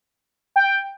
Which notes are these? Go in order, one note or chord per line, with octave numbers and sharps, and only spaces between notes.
G5